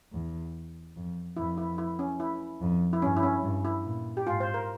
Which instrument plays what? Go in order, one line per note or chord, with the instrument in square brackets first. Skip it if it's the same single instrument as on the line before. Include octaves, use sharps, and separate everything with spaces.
[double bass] E2
F2
[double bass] F2 [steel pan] E4
[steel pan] E4
E4
C#4
E4
[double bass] F2
[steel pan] E4
[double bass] G2 [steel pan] C#4
[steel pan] E4
C#4
[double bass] G2
[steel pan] E4
[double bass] A#2
[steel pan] G4
[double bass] G#2 [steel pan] F4
[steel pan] C5
A#4